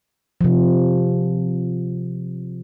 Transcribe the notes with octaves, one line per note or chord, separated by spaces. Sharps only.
C3 F3